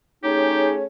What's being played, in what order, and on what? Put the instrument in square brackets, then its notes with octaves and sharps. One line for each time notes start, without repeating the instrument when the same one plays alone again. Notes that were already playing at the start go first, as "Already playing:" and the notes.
[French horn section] A3 C#4 G#4 [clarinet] D#4 [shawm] G4 [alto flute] C#5